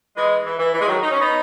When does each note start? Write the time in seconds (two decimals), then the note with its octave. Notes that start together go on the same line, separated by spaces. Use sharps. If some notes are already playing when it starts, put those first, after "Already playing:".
0.17 E3 G#3
0.45 E3
0.59 E3
0.74 E3
0.80 G#3
0.87 D#3 F#3
1.02 D#4
1.11 C#4
1.20 B3 D#4